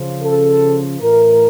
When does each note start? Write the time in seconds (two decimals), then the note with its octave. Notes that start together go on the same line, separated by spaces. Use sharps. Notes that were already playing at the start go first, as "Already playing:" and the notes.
Already playing: C#3 F3
0.20 A4
1.01 A2 E3 A#4